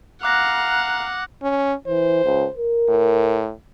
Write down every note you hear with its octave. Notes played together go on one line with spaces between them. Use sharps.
F5 F#5 A#5 D6 F#6 A#6
C#4
E3 C5
C#2
A#4
A2